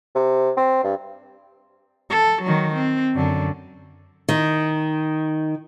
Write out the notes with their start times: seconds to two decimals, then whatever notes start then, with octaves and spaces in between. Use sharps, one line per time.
0.15 C3
0.57 C4
0.84 G2
2.10 A4
2.43 D#3 F#3
2.75 C4
3.15 F#2 D3
4.29 D#3